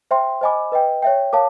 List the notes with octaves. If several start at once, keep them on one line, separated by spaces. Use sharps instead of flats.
C5 E5 G5 C6
C5 D#5 G#5 B5 D6
B4 D#5 G5
C#5 E5 G5
A#4 C#5 F5 A5 D6